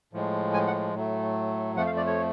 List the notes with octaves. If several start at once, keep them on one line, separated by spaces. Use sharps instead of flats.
A2 F3 G#3
G#5
F#5
A2 F#3 A3
F2 F3 A3 F#5
F5
D5
C#5